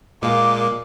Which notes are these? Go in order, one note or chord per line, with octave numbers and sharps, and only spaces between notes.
A#2 G#3 A#3 D6